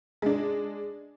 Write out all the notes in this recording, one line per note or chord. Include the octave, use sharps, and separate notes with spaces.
G#3 D4